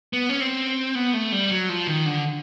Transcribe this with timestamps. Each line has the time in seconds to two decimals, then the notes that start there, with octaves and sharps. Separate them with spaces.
0.13 B3
0.29 C#4
0.40 C4
0.95 B3
1.14 A3
1.32 G3
1.51 F#3
1.69 F3
1.87 D#3
2.06 D3